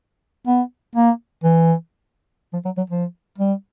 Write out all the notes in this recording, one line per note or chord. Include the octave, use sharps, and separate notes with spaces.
B3
A#3
E3
F3
F#3
F#3
F3
G3